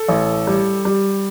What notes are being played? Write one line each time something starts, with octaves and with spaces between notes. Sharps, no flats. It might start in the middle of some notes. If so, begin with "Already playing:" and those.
Already playing: A4
A1
G3
G3